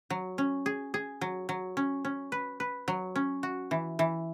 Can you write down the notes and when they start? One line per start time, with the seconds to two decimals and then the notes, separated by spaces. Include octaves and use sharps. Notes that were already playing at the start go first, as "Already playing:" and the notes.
0.10 F#3
0.38 C#4
0.66 G#4
0.94 G#4
1.21 F#3
1.49 F#3
1.77 C#4
2.05 C#4
2.32 B4
2.60 B4
2.88 F#3
3.16 C#4
3.43 F#4
3.71 E3
3.99 E3